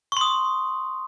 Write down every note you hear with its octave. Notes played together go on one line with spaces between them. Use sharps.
C6 C#6 D#6